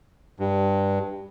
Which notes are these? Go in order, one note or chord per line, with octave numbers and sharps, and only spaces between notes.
G2